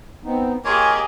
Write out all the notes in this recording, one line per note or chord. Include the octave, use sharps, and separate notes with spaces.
B3 C4 D#4
A#3 F4 G4 G#4 C#5 D#5 G#5